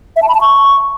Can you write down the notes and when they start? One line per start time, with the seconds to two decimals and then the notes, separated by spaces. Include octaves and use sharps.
0.16 E5
0.22 A5
0.29 B5
0.35 A5
0.41 C#6